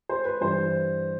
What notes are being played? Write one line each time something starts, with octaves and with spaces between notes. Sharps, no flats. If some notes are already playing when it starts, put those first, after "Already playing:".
C5
B4
G2 E3 C5